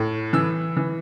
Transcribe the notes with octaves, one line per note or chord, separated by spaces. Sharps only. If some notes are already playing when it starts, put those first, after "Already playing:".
Already playing: A2
E3 E6
E3